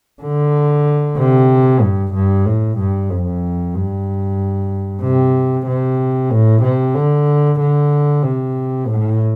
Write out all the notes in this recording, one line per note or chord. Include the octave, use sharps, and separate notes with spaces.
D3
C3
G2
G2
A2
G2
F2
G2
C3
C3
A2
C3
D3
D3
C3
A2